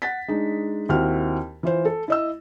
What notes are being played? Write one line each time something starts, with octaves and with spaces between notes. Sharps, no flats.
F#5 A6 B6
G#3 D4 D#4
D#2 C4 E4 F#4 F6
E3 F4 C5
A4
E4 D#5 E6